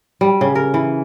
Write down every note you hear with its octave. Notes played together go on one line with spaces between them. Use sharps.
G3
C#3
A#4
E3